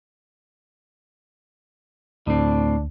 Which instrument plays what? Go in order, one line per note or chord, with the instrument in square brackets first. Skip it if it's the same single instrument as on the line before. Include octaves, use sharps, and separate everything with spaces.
[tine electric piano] D2 [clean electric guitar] A2 C4 [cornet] D4